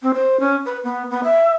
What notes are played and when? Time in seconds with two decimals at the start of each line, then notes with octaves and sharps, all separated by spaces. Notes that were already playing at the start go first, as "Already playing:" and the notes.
0.03 C4
0.14 C5
0.40 C#4
0.66 B4
0.84 B3
1.11 B3
1.24 E5